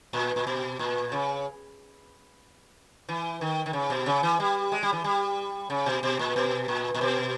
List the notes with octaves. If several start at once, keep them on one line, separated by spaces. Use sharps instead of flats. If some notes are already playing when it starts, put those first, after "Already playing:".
A#2
A#2
B2
A#2
C#3
E3
D#3
D#3
C#3
B2
C#3
E3
G3
G#3
G3
E3
G3
C#3
B2
B2
A#2
B2
A#2
A#2
B2